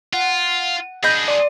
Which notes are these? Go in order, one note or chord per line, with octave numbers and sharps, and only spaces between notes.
F4 F#5
D4 G#4 D#5 B5 G6
D5 C6